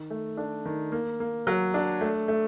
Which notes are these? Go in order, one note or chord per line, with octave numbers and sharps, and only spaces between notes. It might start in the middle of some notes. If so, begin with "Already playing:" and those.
Already playing: D#3
A3
D4
D#3
A#3
A#3
F#3
D4
A3
A3